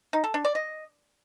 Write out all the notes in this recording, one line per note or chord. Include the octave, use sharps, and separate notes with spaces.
D#4
A4
D4
D5
D#5